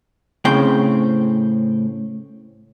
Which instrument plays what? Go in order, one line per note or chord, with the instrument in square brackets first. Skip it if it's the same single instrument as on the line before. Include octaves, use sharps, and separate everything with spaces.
[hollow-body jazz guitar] A2 C#3 C4 C5 G5